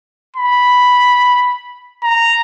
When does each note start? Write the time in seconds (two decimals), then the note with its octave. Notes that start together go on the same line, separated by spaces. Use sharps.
0.36 B5
2.04 A#5